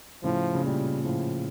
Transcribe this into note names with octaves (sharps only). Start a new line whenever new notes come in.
A2 C#3 F3
C#3
A#2 G3
A2 F3